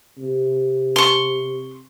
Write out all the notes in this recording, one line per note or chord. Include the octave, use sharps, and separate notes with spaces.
C3
C6 C#6